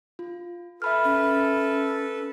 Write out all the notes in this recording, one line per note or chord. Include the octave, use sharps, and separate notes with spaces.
F4
A4 B4 E5 B5 F6
C#4